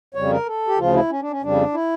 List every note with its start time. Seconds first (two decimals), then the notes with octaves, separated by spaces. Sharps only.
0.14 F2 C#3 G3 C#5
0.31 A#4
0.46 A4
0.67 G4
0.78 D2 C#3 F3 F4
0.94 E4
1.10 C#4
1.21 D4
1.31 C#4
1.42 F2 C#3 G3 D4
1.74 E4